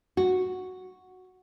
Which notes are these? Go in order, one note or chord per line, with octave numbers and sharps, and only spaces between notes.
F#4